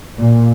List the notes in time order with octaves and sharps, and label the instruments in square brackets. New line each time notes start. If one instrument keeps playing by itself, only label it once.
[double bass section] A#2